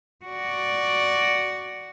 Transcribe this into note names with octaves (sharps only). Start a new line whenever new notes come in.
F#4 D5